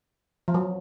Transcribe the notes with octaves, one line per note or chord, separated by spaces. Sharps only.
F3
F#3